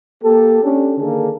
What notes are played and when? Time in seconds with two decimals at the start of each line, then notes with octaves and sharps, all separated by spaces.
0.23 A#3 G4 A4
0.64 C#4 D4 G4 A4
0.97 D3 D#3 A#3 G#4 A4